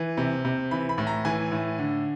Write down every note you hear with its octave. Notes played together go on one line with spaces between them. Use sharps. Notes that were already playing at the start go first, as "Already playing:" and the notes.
Already playing: E3
C3
C3
E3 B5
B5
A2
A#5
E3 G#5
A2
D3